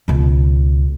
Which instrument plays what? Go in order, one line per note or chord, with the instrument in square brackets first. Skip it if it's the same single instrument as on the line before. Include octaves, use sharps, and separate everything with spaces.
[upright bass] C#2 B2